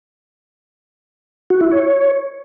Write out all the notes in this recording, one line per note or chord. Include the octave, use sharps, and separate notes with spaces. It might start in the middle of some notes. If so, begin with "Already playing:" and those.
F#4
E4
C#5